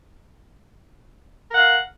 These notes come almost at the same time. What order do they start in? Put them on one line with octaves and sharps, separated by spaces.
A#4 F#5 F5